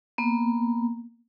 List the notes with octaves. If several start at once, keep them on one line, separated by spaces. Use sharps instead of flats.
A#3 B3